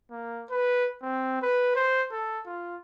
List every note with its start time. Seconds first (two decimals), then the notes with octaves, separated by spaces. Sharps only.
0.11 A#3
0.50 B4
1.02 C4
1.42 B4
1.76 C5
2.12 A4
2.46 F4